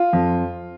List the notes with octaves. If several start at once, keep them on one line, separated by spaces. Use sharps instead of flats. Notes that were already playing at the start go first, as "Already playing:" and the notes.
Already playing: F4
F2